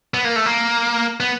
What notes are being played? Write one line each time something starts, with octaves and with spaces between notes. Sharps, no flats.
B3
A#3
A3
A#3
B3